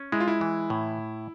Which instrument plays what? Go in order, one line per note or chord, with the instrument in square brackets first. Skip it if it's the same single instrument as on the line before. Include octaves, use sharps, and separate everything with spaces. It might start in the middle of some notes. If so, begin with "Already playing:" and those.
Already playing: [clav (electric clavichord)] C#4
[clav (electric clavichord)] G#3 [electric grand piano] E4
[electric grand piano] F4
E4
[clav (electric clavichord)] E3
A2